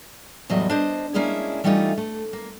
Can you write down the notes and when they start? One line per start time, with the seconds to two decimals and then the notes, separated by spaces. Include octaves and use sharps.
0.50 E2 A2 F#3 G3 D#5
0.70 D4 C5 D#5
1.14 G#3 A#3 C#4 D4 E4 G#4
1.64 E3 G3 A3 C#4 D#4 F4
1.97 A3
2.33 A#3